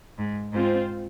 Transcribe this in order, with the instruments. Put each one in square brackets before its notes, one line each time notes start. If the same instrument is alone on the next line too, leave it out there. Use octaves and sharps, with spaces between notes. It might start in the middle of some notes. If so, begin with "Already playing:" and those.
[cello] G#2
[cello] G#2 [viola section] C4 F4 C5